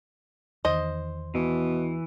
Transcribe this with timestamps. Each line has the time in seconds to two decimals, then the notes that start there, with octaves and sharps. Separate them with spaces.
0.65 E2 D#3 C5 D#5
1.35 B2 E3